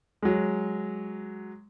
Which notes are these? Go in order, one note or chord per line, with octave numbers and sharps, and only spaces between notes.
F#3 G#3